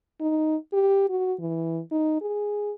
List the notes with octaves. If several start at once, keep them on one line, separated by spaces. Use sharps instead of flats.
D#4
G4
F#4
E3
D#4
G#4